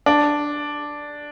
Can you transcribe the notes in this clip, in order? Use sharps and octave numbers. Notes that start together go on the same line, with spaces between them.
D4